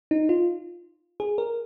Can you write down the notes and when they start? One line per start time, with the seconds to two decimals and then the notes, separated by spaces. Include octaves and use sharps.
0.11 D#4
0.29 F4
1.20 G#4
1.38 A#4